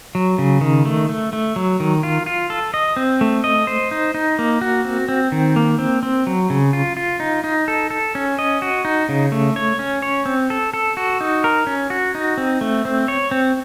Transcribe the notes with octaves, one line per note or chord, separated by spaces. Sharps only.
F#3
C#3
D#3
A3
A3
A3
F#3
D#3
F4
F4
A4
D#5
C4
A3
D#5
C5
D#4
D#4
A#3
F#4
C4
C4
D#3
A#3
C4
C4
F#3
C#3
F4
F4
D#4
D#4
A4
A4
C#4
D#5
F#4
D#4
C#3
A3
C#5
C#4
C#5
C4
A4
A4
F#4
D#4
A#4
C#4
F#4
D#4
C4
A3
C4
C#5
C4